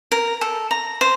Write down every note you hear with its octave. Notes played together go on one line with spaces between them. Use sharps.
A#4
A4
A#5
C5